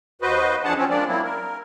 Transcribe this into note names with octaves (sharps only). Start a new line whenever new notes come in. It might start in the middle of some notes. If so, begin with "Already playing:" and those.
D#2 F#4 B4 C5 D#5
F2 F3 D4 G#4 F#5 A5
F3 C4 C#4
F3 G#3 A#3 D4 D5
F#3 A#3 C4 E4
A#4